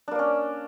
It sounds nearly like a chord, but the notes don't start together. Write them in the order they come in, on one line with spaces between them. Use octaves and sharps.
D4 A#3 D5 C#4